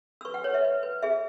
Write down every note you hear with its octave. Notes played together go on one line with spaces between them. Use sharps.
E6
B4 C#6
F#5
B4 C#5
E5
B4
B4
G#4 E5